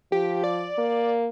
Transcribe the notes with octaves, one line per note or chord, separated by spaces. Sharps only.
F3 G4
D5
A#3